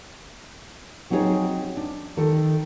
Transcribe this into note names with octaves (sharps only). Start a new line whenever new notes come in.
F#3 C4 D#4 F4 G#4 C#5
D4
D#3 A4